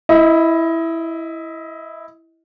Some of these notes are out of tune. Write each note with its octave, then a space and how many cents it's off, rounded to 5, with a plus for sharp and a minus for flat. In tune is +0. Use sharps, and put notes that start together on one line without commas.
E4 +0 D#5 +25